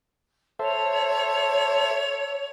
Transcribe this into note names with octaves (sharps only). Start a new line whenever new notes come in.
A4 C5 C#5 E5